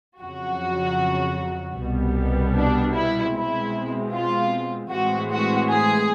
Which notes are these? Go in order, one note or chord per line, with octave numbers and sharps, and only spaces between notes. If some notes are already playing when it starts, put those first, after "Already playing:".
F2 C#3 F#3 F#4
C2 B2 G3 B3
D4
E4
B2 G#3 C4 E4
F4
A2 E3 G#3 C4 F#4
F#4
G#4